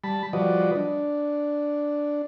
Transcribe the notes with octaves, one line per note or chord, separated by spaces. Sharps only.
G3 A5 B5
F3 G3 F#4 B4 D5 D#5
D4